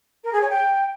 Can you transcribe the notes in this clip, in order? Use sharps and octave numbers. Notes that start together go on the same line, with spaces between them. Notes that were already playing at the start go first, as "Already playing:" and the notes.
A#4
G#4
C#5
G5